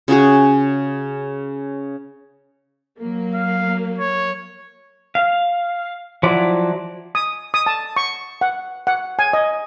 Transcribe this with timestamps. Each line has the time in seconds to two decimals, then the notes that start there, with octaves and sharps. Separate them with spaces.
0.08 C#3 C#4 F#4 G#4
2.99 F#3 A#3
3.34 F5
3.98 C#5
5.15 F5
6.23 F3 F#3 E4 D5
7.15 D#6
7.54 D#6
7.66 A5
7.96 C#6
8.41 F#5
8.87 F#5
9.19 G#5
9.33 D#5